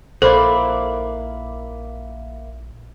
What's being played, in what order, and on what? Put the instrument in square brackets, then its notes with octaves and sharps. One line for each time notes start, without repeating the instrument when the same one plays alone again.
[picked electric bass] A#1 [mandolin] A#3 E4 D5 [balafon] A4 [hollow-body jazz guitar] C5